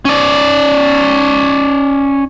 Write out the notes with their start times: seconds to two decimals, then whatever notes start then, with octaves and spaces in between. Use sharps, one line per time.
0.05 C#4 D5